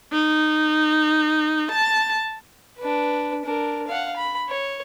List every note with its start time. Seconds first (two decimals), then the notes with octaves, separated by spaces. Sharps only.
0.12 D#4
1.72 A5
2.78 D4 B4
3.44 D4 A#4
3.87 F5 F#5
4.17 B5
4.49 C#5